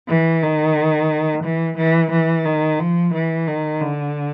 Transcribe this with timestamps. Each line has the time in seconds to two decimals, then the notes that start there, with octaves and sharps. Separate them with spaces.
0.09 E3
0.43 D#3
1.44 E3
1.78 E3
2.12 E3
2.45 D#3
2.79 F3
3.14 E3
3.48 D#3
3.82 D3